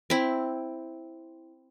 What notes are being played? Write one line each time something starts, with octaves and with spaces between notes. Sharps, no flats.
C4 E4